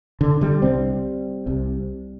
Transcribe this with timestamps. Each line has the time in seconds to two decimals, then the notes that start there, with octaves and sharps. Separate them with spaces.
0.21 D3
0.41 D3 G3
0.62 C2 C3 G3 C4
1.46 C2 C3